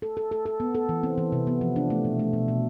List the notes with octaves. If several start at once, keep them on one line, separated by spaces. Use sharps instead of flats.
A4
A4
A4
A4
B3
A4
E3
C4
E3
C3
B3
F3
D4
A3
B2
A3
B2
B2